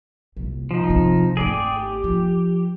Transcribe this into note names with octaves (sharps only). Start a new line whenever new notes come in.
C2 A#2
F3 D#4
C3
G#1 A3 G#4 D5 G5
G4
F3